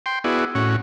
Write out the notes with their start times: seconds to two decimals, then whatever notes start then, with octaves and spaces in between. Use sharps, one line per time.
0.06 G5 C6
0.24 B3 E4 F#4 G#4 D5
0.55 A2 C#4 F#4